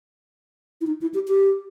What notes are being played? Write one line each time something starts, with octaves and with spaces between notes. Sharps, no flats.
E4
D#4
E4
G4
G4